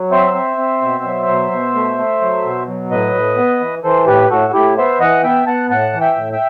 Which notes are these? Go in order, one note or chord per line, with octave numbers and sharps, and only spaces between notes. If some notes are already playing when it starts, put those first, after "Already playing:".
Already playing: F#3
C4 C5 E5
C4
C4
B2
F#3
B2
B2
A3
A3
F#3
B2
F#3
A2 B4 D#5
A2
B3
E3
E3 A4 C5
A2 G4 B4
A2 F#4 A4
A2 E4 G4
B3 C5 E5
E3 D#5 F#5
B3 E5 G5
B3 F#5 A5
A2 F#5 A5
E3
E5 G5
A2
E5 G5